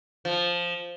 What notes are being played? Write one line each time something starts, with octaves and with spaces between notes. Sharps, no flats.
F3